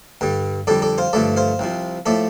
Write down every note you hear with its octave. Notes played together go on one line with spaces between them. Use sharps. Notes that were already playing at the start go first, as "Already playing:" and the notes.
G2 D3 G3
F2 D3 G3 A4 D5
A4 D5
C5 F5
G2 D3 F3 A3 A4 D5
C5 F5
C2 C3 F3
A2 F3 A3 A4 D5